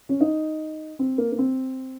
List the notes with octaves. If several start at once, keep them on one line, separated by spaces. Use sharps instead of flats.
C#4
D#4
C4
A#3
A#3
C4